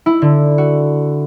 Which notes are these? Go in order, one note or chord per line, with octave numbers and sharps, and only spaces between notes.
E4
D3
F#4